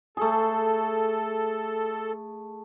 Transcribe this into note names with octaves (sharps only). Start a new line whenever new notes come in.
A3 G#4 A4